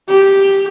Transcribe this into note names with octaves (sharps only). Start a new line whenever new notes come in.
G4